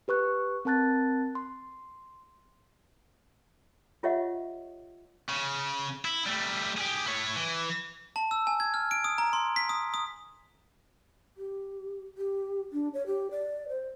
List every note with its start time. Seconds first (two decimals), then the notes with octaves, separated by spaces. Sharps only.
0.08 G4 B4 C#6 F#6
0.65 C4 A#4 A5 F#6 A6
1.35 C6
4.03 F4 G4 C#5 D#5 E5 F#5
5.30 C#3
6.05 E4
6.26 G3 A3
6.77 G4 G#4
7.06 E4 C#5
7.36 E3
8.16 A5
8.31 E6
8.47 G#5
8.60 G#6
8.74 F6
8.91 D7
9.04 D#6
9.18 A#5
9.33 C6
9.56 B6
9.69 D#6
9.94 D#6
11.37 G4
12.18 G4
12.73 D4
12.94 C#5
13.07 G4
13.31 D5
13.69 C5